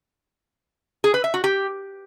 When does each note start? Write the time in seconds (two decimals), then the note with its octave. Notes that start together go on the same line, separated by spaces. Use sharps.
1.04 G#4
1.14 B4
1.24 E5
1.34 F#4
1.44 G4